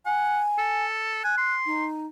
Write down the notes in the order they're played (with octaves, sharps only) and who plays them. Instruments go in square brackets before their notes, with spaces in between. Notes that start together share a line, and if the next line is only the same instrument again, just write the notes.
[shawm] F#5 [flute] G#5
[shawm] A4
[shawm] G#5 [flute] F#6
[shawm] C6
[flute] D#4